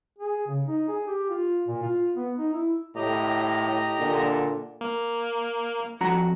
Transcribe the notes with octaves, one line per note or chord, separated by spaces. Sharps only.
G#4
C#3
D#4
G#4
G4
F4
A#2
F4
B3
D#4
E4
A2 G4 D#5 A#5
A#2 D3
A#3
F2 F#4 A#5